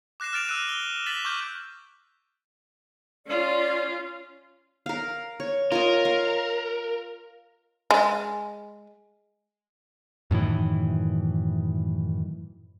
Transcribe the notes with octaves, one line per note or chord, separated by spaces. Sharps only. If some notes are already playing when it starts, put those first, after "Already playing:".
D6 F#6 A#6 C7 E7
F6 A6 D7 F7
E6 F#6 D#7
G7
A6 B6 E7 F#7
C#6 D6 F6 G6
C#4 F4 D5
A#4 F5
C#5
F4 A#4 C#5 D#5
F5
G#3
F#2 A2 D#3 E3